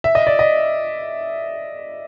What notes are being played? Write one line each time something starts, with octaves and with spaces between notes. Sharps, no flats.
E5
D#5
D5
D#5